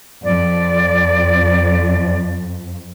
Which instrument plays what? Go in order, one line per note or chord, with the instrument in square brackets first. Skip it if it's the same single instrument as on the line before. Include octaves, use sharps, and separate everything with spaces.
[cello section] F2 [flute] D5